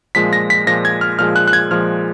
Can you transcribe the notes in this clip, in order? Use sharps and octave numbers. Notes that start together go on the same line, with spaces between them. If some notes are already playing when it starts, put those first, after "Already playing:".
A#2 F3 G#3 B6
A#6
B6
A#2 F3 G#3 A#6
G#6
F6
A#2 F3 G#3 F6
F#6
F#6
G#6
A#2 F3 G#3 F6